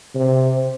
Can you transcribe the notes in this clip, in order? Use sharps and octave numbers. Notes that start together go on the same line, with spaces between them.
C3